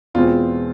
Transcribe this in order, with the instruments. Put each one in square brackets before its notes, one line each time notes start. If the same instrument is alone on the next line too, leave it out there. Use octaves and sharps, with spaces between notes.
[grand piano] E2 B2 G#3 C4 [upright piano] F4